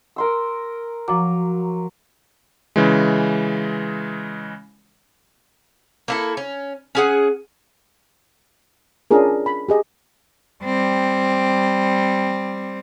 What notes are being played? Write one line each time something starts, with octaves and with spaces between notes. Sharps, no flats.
A#4 C6 E6
F3 F#3 D6
C#3 E3 G#3
A#3 E4 A4
C#4
C#4 G#4 F#5
C#4 D4 F4 G#4 A#4
B5
G4 G#4 D#5
G3 C4